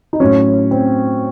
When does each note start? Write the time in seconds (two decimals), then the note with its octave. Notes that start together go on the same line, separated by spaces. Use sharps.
0.13 D#4
0.20 A2 F#3 C#4
0.71 C4